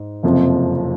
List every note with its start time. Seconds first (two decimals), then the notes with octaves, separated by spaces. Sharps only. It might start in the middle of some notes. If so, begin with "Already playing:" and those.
Already playing: G#2
0.23 F#1 F2 C3 F3